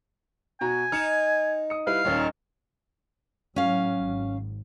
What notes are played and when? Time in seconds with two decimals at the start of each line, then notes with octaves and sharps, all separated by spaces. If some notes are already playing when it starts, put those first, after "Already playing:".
0.61 B2 F#4 G#5 A#5
0.92 D#4 F6 C#7 E7
1.70 D#6 C#7
1.87 G3 E4 B4 F5
2.05 D#1 A#2 D#3 C#4 D#4
3.56 A2 F#3 C#4 F5
4.00 G#1